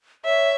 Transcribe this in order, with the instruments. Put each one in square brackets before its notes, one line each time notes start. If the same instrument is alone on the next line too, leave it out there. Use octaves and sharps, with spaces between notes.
[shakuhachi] C#5 [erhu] E5